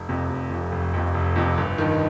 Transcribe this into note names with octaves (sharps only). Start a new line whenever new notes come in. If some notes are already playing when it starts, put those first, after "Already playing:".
Already playing: F1
F2 C3
F1
F2 C3
F1
F2 C3
F1
F2 C3
G1
G2 D#3